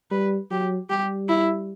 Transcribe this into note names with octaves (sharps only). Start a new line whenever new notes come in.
G3 B4
F#3 G4
G3 G4
E4